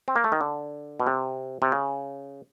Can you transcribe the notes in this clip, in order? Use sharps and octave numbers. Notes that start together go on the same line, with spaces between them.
C4
A#3
A3
D#3
D3
B2
C3
C3
C#3